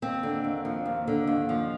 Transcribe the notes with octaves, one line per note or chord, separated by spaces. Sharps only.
D#2 C4
D3
D#2
F3
D#2
D3
D#2
F3